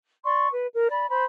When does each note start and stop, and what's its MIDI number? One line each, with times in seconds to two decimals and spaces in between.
0.24 0.48 74
0.24 0.48 84
0.24 0.48 85
0.54 0.68 71
0.75 0.88 70
0.90 1.06 74
0.90 1.06 83
1.10 1.25 72
1.10 1.25 83
1.10 1.25 84